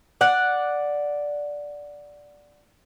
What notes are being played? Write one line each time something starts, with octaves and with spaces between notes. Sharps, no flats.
D5 F#5